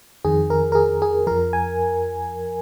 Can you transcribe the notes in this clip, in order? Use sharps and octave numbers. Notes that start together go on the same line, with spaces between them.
F2 D#3 G#4
A#4
A#4
G#4
G#4
F2 F3 A#4
G#5